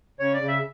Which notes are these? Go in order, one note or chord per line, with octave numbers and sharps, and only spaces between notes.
C#3 C#5
D5
C#3
E5